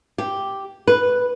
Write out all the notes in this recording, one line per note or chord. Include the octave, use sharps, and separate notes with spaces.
G4
B4